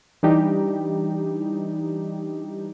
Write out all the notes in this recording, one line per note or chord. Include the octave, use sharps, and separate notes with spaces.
E3 G3 D4 D#4 G4